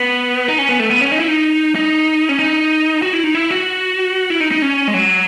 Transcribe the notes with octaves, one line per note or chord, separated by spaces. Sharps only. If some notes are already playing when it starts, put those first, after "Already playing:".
Already playing: B3
D#4
C#4
B3
A3
B3
C#4
D#4
E4
D#4
D#4
C#4
D#4
F#4
E4
D#4
E4
F#4
E4
D#4
D#4
C#4
G#3
F#3